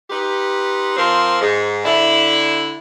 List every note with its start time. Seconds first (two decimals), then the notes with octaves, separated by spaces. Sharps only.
0.10 D#4 G4 B4 C6
0.97 F3 C4 A#4 C6
1.41 G#2
1.85 D3 D4 E4